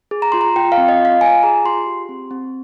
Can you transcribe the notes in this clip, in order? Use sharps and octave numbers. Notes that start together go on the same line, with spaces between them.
G#4
A#5
F4 C6
A#5
F4 G5
F5
C4
D#5
F4
F5
F4 G#5
G#4 A#5
F4 C6
G4
C4
C4